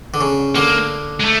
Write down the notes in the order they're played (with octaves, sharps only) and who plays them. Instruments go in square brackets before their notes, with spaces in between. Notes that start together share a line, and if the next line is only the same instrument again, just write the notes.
[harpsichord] D3
C#3
[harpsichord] D3 [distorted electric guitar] A#3
[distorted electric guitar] G#3
A3